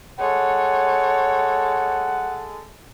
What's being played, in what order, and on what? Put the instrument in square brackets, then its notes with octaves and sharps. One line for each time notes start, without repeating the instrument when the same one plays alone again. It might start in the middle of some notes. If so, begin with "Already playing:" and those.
[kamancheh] G#3 A4 [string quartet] C#5 [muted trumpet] F#5